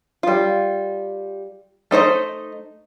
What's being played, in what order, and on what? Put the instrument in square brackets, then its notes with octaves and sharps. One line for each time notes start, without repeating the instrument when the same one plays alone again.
[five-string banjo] G3 F4
A3 D#4 C5 D#5